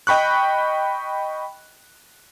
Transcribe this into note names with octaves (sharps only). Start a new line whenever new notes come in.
D#5 G5 B5 C#6 F#6